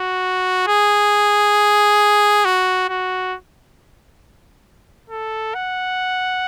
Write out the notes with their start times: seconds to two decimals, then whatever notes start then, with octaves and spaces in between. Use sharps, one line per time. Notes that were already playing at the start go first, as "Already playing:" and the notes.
Already playing: F#4
0.68 G#4
2.45 F#4
2.89 F#4
5.10 A4
5.54 F#5